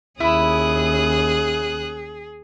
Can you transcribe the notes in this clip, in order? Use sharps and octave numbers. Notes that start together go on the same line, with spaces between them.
D#2 C#4 E4 G#4 D#6 F#6